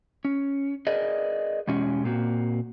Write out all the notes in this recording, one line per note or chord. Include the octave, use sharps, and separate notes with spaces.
C#4
G#4 A#4 B4 D5 D#5
E2 B2 G#3 C#4 G4
A#2 A#3 C4 F#4